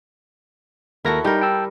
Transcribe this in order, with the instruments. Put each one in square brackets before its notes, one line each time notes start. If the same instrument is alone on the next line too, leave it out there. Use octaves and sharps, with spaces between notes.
[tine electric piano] D#2 A#4 A#6 [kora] E4 F#4 A4
[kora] G3 A#4 [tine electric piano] D#4 G6
[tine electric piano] G5 A5 E6